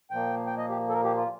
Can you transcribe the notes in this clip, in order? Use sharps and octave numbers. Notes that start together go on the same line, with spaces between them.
A#2 F3 A#3 G5
G5
D#5
G4
A4
A#4
G4
F4